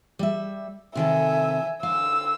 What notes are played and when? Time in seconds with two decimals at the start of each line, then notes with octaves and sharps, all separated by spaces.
0.19 G3 E5
0.95 C3 D#3 A4 E5 G#5
1.83 D3 F5 G#5 E6